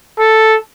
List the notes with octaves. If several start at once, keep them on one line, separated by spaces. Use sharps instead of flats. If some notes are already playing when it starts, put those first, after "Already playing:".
A4